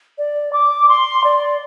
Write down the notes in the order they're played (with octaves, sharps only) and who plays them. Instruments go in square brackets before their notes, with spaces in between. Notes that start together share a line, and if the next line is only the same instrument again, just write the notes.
[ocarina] D5
D6
C6
D5